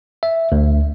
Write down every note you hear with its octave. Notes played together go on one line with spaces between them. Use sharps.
E5
D2